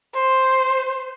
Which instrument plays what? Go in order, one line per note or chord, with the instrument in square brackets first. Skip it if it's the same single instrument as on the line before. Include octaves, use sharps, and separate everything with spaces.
[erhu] C5